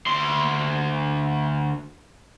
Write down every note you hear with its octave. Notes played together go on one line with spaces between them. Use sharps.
D2 C6